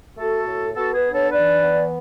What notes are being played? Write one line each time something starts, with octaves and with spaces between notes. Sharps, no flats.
A3 F#4 A4
A2
B3 F#4 A4
G#4 B4
D4
A4 C#5
E3 B4 D5
B3